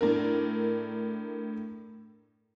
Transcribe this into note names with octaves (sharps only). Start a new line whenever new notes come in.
A2 D4 A#4